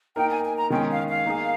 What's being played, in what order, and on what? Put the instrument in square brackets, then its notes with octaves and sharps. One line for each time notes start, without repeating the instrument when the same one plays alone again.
[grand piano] A#3 D#4 A#4 [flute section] G5
[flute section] G#5
G#5
A#5
[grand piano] D#3 G#3 C#4 G#4 [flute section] G5
[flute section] F5
F5
[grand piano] A#3 D#4 G#4